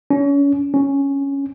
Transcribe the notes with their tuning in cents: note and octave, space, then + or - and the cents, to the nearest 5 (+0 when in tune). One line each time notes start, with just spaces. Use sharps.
C#4 +30
C#4 +0